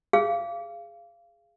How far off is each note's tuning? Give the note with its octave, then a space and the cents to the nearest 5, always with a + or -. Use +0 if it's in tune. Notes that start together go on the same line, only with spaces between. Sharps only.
G#4 -10 F5 -25